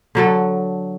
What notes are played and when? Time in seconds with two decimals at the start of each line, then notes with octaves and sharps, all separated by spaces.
0.15 D3 F#3 A4